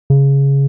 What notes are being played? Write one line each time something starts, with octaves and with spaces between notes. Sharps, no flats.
C#3